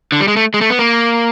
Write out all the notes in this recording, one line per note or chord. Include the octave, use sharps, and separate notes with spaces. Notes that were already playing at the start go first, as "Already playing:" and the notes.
D3
G3
G#3
A3
G#3
A3
B3
A#3